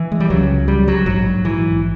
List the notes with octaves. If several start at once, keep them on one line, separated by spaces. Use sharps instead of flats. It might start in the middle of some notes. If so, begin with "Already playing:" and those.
Already playing: E3
G#3
G3
C#2 C#3 F#3
G3
F#3
A#1 G#2 F#3
E3